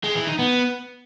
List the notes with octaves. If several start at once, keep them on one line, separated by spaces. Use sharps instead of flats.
G#3
E3
D#4
B3